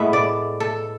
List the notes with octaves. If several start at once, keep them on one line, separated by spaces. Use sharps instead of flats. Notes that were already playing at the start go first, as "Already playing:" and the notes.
Already playing: A2 G#3 B3 E5
D5
A4